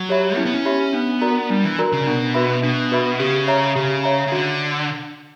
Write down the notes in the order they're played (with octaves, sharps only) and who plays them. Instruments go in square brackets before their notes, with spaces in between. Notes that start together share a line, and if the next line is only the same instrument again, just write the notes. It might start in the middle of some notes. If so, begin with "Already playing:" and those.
Already playing: [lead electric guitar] F#3
[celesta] G4 C#5 E5 B5
[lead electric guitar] C#4 [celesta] E4
[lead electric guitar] B3
C#4
[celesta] G4 C#5 E5 B5
[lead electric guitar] B3 [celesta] D4
[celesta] F#4 A#4 D5 A#5
[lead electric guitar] G3 [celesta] D4
[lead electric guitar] E3
[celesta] F#4 A#4 D5 A#5
[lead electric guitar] C#3
[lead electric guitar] B2 [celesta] D4
[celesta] F#4 B4 E5 B5
[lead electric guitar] B2 [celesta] D4
[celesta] F#4 B4 E5 B5
[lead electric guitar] C#3 [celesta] G4
[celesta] C#5 E5 A#5
[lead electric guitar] C#3 [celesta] G4
[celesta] C#5 E5 A#5
[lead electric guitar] C#3
[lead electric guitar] D3 [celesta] F#4